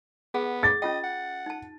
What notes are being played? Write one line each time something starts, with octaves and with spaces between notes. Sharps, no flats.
B3 G#4 F#5
G#4 D6 A6
C#4 F4 D#5 G5
F#5
D#4 A5